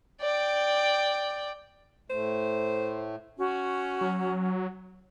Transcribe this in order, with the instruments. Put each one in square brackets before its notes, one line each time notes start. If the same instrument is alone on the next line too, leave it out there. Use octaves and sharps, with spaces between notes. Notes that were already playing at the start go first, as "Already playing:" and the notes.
[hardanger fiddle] D5 G5
[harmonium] A2 A3 [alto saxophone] C5
[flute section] C#4 F#4
[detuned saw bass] F#3